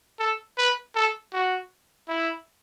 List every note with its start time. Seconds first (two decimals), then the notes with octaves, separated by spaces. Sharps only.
0.19 A4
0.58 B4
0.95 A4
1.33 F#4
2.08 E4